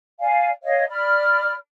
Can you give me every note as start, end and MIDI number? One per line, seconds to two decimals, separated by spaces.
0.19 0.49 74
0.19 0.49 77
0.19 0.49 80
0.63 0.84 73
0.63 0.84 75
0.63 0.84 77
0.89 1.53 74
0.89 1.53 83
0.89 1.53 89